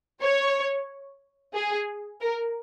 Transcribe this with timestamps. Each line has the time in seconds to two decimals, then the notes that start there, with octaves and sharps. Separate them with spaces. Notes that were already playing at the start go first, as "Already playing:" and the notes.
0.22 C#5
1.55 G#4
2.21 A#4